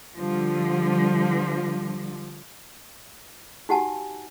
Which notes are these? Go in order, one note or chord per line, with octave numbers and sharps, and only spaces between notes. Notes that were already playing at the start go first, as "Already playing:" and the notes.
D3 F3 G3
D#4 F#4 G4 F#5 G#5 A5